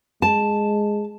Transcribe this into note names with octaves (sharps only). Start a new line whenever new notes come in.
G#3 A5